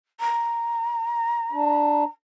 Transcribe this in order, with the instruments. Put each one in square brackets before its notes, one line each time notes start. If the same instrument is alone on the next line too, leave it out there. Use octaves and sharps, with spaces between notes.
[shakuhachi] A#5
[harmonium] D4